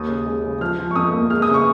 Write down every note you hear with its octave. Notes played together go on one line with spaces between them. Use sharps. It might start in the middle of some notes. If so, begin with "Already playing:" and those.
Already playing: D#2 D#6
C#3
G#3
C#3
F3 F6
F3
C#6
F2 D#6
A#3
G#3 F6
D#6
C#3
C#6